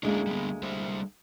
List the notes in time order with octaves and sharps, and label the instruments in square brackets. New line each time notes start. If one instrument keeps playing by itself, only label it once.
[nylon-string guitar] D2 G#3 A#3 [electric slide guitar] C#4 D4 E4
[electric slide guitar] G3 B3
G3 C5 E5